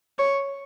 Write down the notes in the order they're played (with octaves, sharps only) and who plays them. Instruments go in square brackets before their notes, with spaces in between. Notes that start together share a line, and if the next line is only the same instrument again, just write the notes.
[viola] C#5